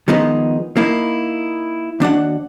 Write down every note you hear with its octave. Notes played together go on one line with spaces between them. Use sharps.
D#3 F3 G#3 B3 D#4
A#3 D#4 E4
D#2 D4 F#4 F#5